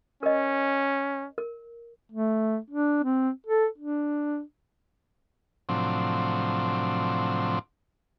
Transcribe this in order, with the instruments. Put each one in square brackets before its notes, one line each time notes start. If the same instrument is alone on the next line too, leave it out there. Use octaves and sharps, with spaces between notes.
[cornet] C#4 [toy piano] A#4 D#5
[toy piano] A#4
[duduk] A3
D4
C4
A4
D4
[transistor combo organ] A2 C3 F3 F#3 C4 D4